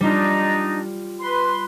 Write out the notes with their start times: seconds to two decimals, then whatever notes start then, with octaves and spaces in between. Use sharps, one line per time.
0.01 G3 D4 D#4 F4
1.19 B4 C6